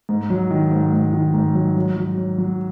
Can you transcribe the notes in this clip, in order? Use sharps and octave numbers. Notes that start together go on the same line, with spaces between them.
G#2
F#3
D#3
G#2
G#2
D#3
G#2
F#3
F#3
F#3
F#3
F#3